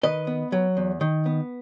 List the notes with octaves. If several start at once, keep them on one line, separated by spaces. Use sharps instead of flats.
D#3 B4 D#5
B3
F#3
E2
D#3
B3